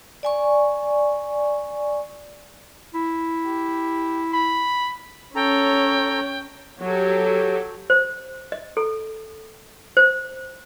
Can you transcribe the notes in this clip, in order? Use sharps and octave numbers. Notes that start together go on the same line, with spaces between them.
D5 G#5 C#6
E4
G4
B5
C#4 A4 C#5 G5 A#5
F#3 G4 A4
C5
D#5
A4
C5